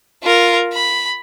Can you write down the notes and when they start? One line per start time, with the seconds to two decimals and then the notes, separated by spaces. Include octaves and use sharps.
0.23 F4 A#4
0.73 B5